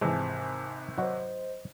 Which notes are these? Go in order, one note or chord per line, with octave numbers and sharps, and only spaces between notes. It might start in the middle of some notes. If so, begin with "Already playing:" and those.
G#1 C3 E3 G#3 G#5 A5
F#3 F#4 C5 D#5